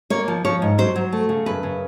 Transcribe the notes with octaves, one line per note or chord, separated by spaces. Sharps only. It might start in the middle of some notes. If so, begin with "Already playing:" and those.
A#3 C#5
F3
F3 C#5
G#2
F#3 C5
F#3
A3
C#3
F#2 B4
C#3